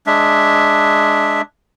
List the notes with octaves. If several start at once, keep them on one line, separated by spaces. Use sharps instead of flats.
G#3 D4 E5